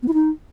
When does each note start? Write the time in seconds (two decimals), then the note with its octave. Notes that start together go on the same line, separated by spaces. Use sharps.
0.03 B3
0.08 E4
0.13 D#4